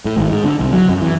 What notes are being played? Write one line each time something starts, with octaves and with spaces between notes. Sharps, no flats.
A2
G#1
G#2
D3
C2
F#3
F#2
E3